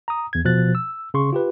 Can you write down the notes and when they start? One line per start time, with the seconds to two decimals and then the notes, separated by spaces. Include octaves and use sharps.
0.08 A#5 D#6
0.33 E2 G#6
0.45 B2 F3 F#6 A6
0.75 E6
1.14 C#3 C6 C#6
1.33 F4 G4 B4